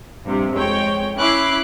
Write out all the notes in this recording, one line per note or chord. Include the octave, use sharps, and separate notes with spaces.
A#1 G2 C3
F2 G#3 C#5 G5
C#4 E4 B5 D6 F#6 C7